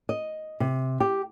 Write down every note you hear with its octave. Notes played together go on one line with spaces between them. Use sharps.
D#5
C3
G4